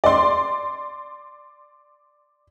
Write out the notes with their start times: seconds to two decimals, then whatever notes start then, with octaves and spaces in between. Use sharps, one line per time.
0.04 D5 C6